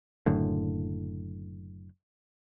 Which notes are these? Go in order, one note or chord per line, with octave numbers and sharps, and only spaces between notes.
F#1 F#2 A2 D3